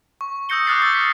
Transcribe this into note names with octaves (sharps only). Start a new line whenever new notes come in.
C#6
D#6 E6 G6 A#6 C#7 G7
D6 D#6 F6 F#6 A6 C7
E6 F#6 A6
A6 B6